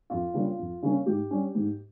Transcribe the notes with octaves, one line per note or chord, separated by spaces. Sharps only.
F2 F4
C#3 G3 A#3 C#4
F2
C#3 G3 A#3 C#4
G#2 G4
G3 C#4
G#2